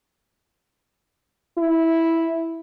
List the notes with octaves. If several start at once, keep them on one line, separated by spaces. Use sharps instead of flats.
E4